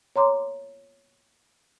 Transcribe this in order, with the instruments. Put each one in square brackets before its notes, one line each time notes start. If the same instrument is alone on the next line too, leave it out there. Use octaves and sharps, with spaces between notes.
[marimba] C#5 A#5 C6 D6